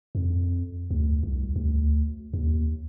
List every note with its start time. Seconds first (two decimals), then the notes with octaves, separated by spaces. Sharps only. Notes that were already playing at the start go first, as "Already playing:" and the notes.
0.15 F2
0.91 D2
1.23 C2
1.56 D2
2.33 D#2